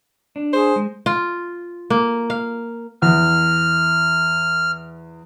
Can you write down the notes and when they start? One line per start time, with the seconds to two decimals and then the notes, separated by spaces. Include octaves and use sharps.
0.36 D4
0.53 G#4 C5
0.76 G#3
1.06 F4
1.90 A#3
2.30 F5
3.02 E2 F6